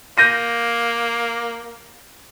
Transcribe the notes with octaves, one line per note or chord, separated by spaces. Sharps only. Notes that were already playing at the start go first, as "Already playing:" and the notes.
A#3 G6 A#6 D#7